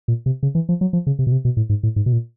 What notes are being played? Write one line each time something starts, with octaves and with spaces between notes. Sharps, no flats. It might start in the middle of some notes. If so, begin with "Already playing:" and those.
A#2
C3
C#3
E3
F3
F#3
F3
C#3
C3
B2
C3
B2
A2
G#2
A2
G#2
B2
A#2